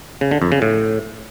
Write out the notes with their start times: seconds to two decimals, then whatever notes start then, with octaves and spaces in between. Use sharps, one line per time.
0.21 C#3
0.31 D3
0.42 F2
0.52 C#3
0.62 A2